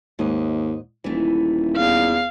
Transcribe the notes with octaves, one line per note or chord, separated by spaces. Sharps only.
D#2 G#2 D#5
D#1 E3 A3
E2 F5